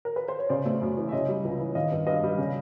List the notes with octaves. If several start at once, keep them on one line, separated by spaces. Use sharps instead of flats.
A#4
B4
C5
C#5
C#3 C5 D5
A3
F#2
E3
E5
C#3 C#5 D#5
G3
C#2
E3
D#3 D#5 F5
G2
G2 D#5 F5
G3
C#3